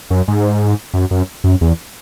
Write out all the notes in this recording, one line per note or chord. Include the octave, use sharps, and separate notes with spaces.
F#2
G#2
F#2
F#2
F#2
E2